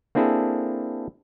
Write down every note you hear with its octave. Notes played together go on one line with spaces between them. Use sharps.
A#3 C4 D4 E4 G#4 A4